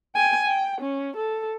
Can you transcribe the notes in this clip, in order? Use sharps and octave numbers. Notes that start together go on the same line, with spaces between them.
G5 G#5
G5
C#4
A4